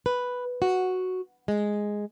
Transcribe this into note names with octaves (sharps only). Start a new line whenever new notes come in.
B4
F#4
G#3